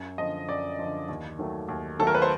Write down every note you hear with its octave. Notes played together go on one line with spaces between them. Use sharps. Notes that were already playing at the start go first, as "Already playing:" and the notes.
Already playing: F#2
D3 F3 D#5
F#2 D5
D3 F3
D#2
D#3 F#3 A3
D#2
D#3 F#3 A3 A4
A#4
B4
C5